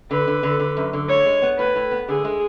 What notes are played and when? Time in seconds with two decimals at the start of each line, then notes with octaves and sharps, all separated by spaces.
0.11 D3 B4
0.28 D3
0.43 D3
0.60 D3
0.77 F#2
0.93 D3
1.09 A2 C#5
1.26 G#3
1.42 B3
1.58 A2 B4
1.76 A2
1.92 B3
2.09 D3 G#4
2.24 G#3